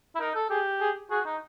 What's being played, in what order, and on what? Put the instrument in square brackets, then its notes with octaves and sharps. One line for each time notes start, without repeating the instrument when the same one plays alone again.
[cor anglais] E4
[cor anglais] D#4 [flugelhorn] A#4
[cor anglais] A4
[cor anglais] G4 [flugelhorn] G#4
[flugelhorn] G#4
[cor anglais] F#4 [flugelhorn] G#4
[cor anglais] D#4